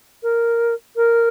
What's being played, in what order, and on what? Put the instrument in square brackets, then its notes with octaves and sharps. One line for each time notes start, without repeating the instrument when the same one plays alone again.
[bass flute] A#4
A#4